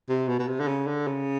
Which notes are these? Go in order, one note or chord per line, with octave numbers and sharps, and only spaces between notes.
C3
B2
B2
C3
D3
C#3
D3
C#3